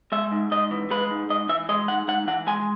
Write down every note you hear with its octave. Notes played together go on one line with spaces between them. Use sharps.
G#3 E5
G#2
G#2 D#5
E3
G#3 B4
G#2
G#2 D#5
E3 E5
G#3 D#5
G#2 F#5
G#2 F#5
E3 F#5
G#3 G#5